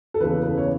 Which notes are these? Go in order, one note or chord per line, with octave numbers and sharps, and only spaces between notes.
A4
E2 C#3 E3 B4
B4
C#5